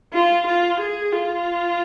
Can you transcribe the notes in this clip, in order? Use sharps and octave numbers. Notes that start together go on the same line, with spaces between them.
F4
F4
G#4
F4